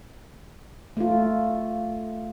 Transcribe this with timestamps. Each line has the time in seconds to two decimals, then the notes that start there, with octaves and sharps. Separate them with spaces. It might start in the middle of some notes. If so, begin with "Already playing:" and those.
0.97 A3 F4